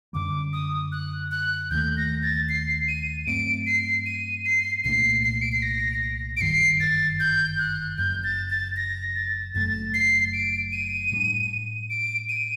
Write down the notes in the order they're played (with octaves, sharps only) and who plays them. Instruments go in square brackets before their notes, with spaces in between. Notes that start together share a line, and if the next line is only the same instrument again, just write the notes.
[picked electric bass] F#2 D3 G3 [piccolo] D6
[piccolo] D#6
F#6
F#6
[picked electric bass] D#2 D#3 A3 [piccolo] G6
[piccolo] A#6
A6
C7
D#7
[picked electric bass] G2 F#3 A3 C4 [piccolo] D7
[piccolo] C7
D#7
C7
[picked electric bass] C2 A#2 A3 D4 [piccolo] C7
[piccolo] C7
D7
C7
A#6
D7
[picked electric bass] G1 F#2 D#3 G3 [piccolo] C7
[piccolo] A6
G6
F#6
[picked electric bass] F#1 F#2 F#3 [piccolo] G6
[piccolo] A6
A6
A#6
A6
[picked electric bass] F#1 F#2 F#3 A3 [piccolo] A6
[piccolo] C7
D7
D#7
[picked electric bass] A2 G3 D4
[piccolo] D7
D#7